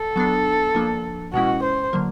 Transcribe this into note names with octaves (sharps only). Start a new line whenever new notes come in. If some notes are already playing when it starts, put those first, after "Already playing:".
Already playing: A4
F#3 B3 D4
F3 A#3 D4
B2 G#3 C#4 E4 F#4
C5
D3 F#3 A#3